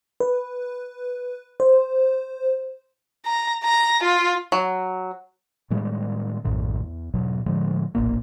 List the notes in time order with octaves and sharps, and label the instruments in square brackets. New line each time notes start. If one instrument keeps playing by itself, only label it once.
[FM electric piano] B4
C5
[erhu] A#5
A#5
F4
[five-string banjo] F#3
[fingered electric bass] A2 D#3 G3 G#3
A#1 F#2 A2 D#3
E2
E2 G#2 B2 F#3
A2 D3 F3 G#3
F1 A#1 A2 A#3